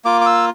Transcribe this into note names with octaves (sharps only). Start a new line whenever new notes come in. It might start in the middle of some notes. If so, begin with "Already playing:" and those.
A#3 F4 D6
D6
E6